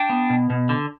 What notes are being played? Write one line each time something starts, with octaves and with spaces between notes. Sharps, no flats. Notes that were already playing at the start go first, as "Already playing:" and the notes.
Already playing: D4 G5
B3
B2
B2
D3